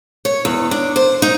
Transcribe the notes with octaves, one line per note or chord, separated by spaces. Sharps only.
C#5
E2
D4
C5
D#4